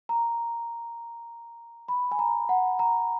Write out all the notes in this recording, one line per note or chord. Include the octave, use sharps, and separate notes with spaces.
A#5
B5
G#5
A#5
F#5
A#5